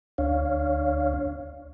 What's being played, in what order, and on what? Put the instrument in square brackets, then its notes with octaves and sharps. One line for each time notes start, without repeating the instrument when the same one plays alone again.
[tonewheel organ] D2 D4 C#5 F5